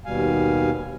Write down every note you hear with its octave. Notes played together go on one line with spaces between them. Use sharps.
D#2 B2 G3 F5 G#5